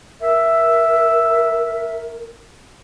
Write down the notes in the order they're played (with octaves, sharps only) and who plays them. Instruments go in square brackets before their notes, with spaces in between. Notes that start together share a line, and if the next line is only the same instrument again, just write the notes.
[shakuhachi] A#4 [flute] E5